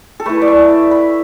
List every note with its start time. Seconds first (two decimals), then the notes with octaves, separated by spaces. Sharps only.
0.20 A4
0.26 A3 E4 B4
0.42 D5
0.48 E5
0.91 B5